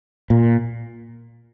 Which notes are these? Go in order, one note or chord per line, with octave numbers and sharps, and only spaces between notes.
A#2